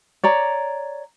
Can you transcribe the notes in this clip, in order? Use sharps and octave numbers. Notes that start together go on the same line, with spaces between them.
C#5 D5 A#5